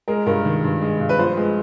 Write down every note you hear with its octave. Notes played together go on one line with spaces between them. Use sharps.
G#3 A#4
G2 A#4
D#3
G2
G#3
G2
B4
F3 C5
G#3